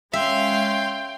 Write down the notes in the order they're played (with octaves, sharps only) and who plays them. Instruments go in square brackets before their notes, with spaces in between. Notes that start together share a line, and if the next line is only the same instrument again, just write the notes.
[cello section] G#3 C#4 [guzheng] E5 [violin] F5 C6 [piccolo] G5